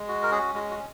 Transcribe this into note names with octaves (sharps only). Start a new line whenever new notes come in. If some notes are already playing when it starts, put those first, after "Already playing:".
Already playing: G#3
F#4
A#4
C#4 G#4
G#3 F#4
F#4